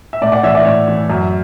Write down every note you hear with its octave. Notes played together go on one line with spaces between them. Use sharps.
E5
A2 D5
D5 F#5
E3 C#5 E5
D5
A2 C#5
E3
F#2